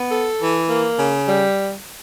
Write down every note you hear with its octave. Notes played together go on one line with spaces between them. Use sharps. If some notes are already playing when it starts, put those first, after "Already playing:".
Already playing: B3
A4
E3
A#3
C#3
G3